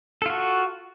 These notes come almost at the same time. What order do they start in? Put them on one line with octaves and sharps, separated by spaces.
A4 F4 F#4